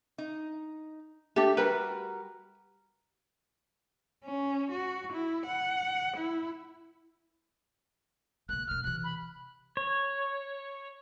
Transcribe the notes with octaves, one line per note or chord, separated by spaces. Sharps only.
D#4
A3 D4 G4
G3 F#4 A#4 B4
C#4
F#4
E4
F#5
E4
C#3 A#3 F#6
E1 A#3 F6
C3 E3 F#6
B5
C#5